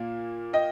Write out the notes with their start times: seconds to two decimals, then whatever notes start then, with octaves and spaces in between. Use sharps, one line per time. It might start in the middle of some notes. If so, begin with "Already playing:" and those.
Already playing: A#2 A#3
0.53 D#5 G5